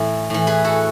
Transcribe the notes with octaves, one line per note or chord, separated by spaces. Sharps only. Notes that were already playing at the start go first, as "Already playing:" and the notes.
Already playing: A2 E3
A2 E3
G#4 B4
F#4 A4